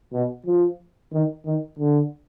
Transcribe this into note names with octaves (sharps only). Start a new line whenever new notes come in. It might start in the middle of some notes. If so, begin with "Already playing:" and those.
B2
F3
D#3
D#3
D3